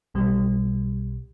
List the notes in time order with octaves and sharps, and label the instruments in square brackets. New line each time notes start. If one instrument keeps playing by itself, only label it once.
[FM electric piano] B1 B2 G3